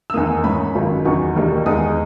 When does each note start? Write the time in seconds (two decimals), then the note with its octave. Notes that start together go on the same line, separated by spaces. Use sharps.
0.10 E6
0.14 E2 D#3 A#3 D#6
0.44 G#2 E3 A#3 C#4 B5
0.75 G#1 F#2 D#3
1.05 E2 D#3 F#3 C#6
1.36 E1 D#2 D#3 A#3
1.66 E2 D#3 G#3 D#6